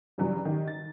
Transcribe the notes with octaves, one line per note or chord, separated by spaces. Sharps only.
G2 C#3 E3 F#3 G3
D#3 G4
A6